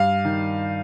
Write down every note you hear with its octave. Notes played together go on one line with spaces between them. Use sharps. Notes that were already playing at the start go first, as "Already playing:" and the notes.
Already playing: G2 F5
D#3